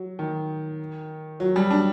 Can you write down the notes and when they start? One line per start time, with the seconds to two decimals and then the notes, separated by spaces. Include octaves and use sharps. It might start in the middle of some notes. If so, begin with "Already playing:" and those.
Already playing: F#3
0.19 D#3
1.40 F#3
1.56 G3
1.71 D4